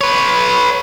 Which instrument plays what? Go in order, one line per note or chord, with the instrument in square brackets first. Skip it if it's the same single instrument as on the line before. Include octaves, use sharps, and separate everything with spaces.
[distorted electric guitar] B4 C#5